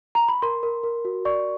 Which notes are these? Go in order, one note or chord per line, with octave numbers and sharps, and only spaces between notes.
A#5
B5
A#4 C6
A#4
A#4
F#4
D5 C#6